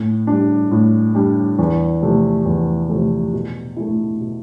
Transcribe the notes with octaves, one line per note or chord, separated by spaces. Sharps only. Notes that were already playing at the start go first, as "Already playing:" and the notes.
Already playing: A2
G3 D4
A2
G3 D4
E2
C3 F3 A3
E2
C3 F3 A3
B2
A3 E4
B2